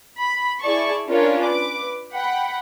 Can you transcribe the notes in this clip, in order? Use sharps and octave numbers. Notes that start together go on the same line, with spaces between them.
B5
E4 G#4 D5 A5 C#6
C#4 D4 F4 A#4 C#5
B4 D6
F#5 G5 B5